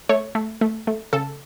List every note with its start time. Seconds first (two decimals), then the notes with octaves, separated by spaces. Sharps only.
0.09 A3 C#5
0.35 A3
0.61 A3
0.87 A3
1.13 C#3 A4